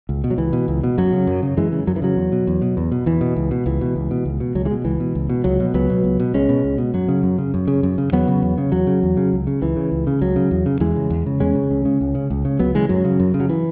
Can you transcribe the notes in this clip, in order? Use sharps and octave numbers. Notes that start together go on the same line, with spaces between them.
C#2
B2
F#3
C#2 E3
B2
C#2
B2
F#2 F#3
C#3
F#2
C#3
F#2 E3 G#3
C#3
F#2 F#3
E3
C#3 F#3
E2
B2
E2
B2
E2
B2
E2 E3
B2
C#2
B2
C#2 E3
B2
C#2
B2
C#2
B2
C#2 F#3
E3 G#3
B2
C#2 E3
B2
C#2
B2
C#2 F#3
B2
C#2 F#3 B3
B2
C#2
B2
C#2 G#3 C#4
B2
C#2
B2
F#2 F#3
C#3
F#2
C#3
F#2
C#3
F#2
C#3
E2 F#3 B3
C#3
E2
C#3
E2 F#3
C#3
E2
C#3
C#2
C#3
C#2 E3
C#3
C#2
C#3
C#2 F#3
C#3
E2
C#3
E2 E3 G#3
C#3
E2
C#3
E2 G#3 C#4
C#3
C#2
C#3
C#2
C#3
C#2
C#3
C#2 F#3 B3
C#3 E3 G#3
F#2 F#3
C#3
F#2
C#3
F#3
E3